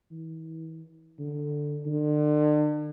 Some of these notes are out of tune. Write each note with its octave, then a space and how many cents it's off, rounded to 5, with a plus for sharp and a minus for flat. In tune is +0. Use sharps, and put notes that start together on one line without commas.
E3 -40
D3 +5
D3 +35